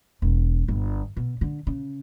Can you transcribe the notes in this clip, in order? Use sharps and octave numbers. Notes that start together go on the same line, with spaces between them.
E1
G1
B2
D3
C#3